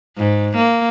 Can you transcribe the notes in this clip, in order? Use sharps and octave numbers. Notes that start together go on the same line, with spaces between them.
G#2
A#3